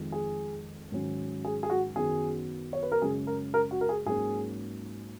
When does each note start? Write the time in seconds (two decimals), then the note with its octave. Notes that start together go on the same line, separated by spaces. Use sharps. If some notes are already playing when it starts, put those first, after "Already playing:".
Already playing: F2 D#3 G#3
0.12 G#4
0.92 G#2 D#3 F#3 C#4
1.45 G#4
1.63 G#4
1.70 F#4
1.96 F#2 D#3 F#3 B3 G#4
2.73 C#5
2.83 B4
2.92 A#4
3.01 F#2 C#3 G#3 C#4 G#4
3.27 A#4
3.54 A#4
3.71 F#4
3.81 A#4
3.89 G#4
4.06 G#2 F#3 A#3 C#4 G#4